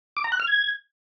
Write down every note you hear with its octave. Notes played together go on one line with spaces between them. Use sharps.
D6
A#5
F#6
F6
G#6